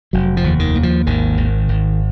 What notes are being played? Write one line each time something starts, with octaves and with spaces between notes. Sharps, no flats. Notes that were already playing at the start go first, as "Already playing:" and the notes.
F1 F#3
F3
D#2
D#3
D#2
F3
G#1 D#3
G#1
G#1